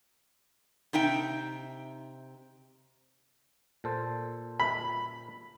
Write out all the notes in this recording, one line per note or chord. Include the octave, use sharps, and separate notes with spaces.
C3 D#4 E5 G5
A#2 A4 C5
B5